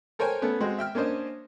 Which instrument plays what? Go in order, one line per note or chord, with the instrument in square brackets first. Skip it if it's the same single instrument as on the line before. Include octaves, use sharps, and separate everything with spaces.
[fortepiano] A4 A#4 C5 C#5 G5 G#5
A3 B3 C#4
G#3 C4 F#4
E5 G5 F6
A#3 C#4 D4 C5 D#5